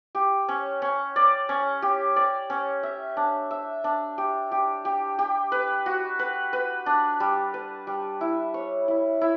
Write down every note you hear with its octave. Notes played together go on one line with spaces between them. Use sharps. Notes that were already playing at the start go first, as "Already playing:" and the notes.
G4
C#4
C#4
D5
C#4
G4
D5
C#4
E5
D4
E5
D4
G4
G4
G4
G4
B4
F#4
B4
B4
D4
G3
B4
G3
E4
C#5
E4
E4